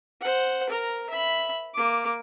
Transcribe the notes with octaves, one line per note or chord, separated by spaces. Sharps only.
C5 F#5
A#4 A#5
E5 B5
A#3 D6